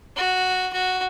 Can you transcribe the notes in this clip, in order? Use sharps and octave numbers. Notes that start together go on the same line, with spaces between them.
F#4
F#4